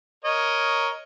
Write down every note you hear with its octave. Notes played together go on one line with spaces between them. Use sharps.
A#4 C#5 D#5